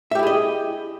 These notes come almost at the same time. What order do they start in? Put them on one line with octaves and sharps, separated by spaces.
E5 G4 E4 G#4 D#5